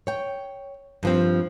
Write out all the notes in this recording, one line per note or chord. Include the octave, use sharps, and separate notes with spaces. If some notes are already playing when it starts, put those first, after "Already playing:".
C#5 G5
G2 F3 C4